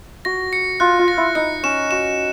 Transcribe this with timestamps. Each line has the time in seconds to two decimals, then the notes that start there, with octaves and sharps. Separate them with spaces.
0.25 F#4 A#6
0.53 C#7
0.80 F4 F#6
0.99 F4
1.08 A#6
1.18 E4
1.35 D#4 C#7
1.63 C#4 E7
1.91 F#4 E7